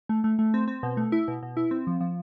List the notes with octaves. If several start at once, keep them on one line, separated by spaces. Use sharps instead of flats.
A3
A3
A3
C4
C4
B2
A3
E4
B2
B2
E4
C4
F3
F3